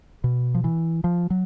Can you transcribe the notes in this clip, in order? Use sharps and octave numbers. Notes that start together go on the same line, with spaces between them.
B2
F3
E3
F3
F#3